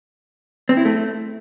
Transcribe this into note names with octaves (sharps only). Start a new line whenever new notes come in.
C4
E4
A3